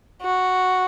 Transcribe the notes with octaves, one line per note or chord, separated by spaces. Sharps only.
F#4